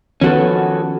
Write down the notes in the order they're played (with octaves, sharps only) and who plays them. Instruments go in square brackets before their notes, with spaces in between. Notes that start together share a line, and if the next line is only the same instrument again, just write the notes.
[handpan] D#3 F3 B3 [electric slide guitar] C#4 F#4 A4